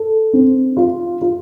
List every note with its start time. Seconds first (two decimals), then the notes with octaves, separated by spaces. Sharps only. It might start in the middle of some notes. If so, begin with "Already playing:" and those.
Already playing: A4
0.33 C4
0.77 F4
1.21 F4